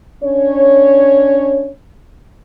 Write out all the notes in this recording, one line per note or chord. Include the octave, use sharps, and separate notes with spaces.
C#4 D4 C#5